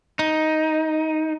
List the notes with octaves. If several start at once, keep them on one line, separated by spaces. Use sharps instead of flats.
D#4